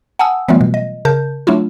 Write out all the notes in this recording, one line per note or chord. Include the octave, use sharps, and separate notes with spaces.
F#5 G#5 A5 D#6 E6
E3 F#3 G3 A3 B3 F4
B2
D#5
C#3 A#4 A5 G6
F#3 A3 D4 E4 F4